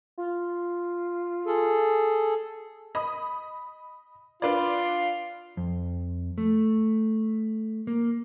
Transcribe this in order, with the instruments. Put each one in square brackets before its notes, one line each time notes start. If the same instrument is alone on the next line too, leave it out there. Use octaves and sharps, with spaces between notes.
[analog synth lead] F4
[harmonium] G#4 A4
[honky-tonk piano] D#5 B5 D#6
[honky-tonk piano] D4 B4 D5 [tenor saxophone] F4
[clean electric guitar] F2
A3
A#3